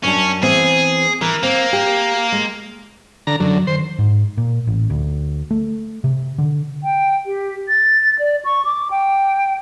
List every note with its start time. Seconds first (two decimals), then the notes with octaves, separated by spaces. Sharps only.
0.03 F#2 C#4 D4 A5
0.43 E3 B3 C4 G#4
1.21 E3 A#4
1.43 A#3 C4
1.73 G4
2.32 G#3
3.27 D3 A#5
3.40 F#2 D3 F#3
3.67 D#3 C5
3.99 G#2
4.38 A#2
4.67 A1
4.90 D2
5.51 A3
6.04 C3
6.38 D3
6.84 G5
7.26 G4
7.68 A6
8.19 D5
8.45 C#6
8.65 D6
8.91 G5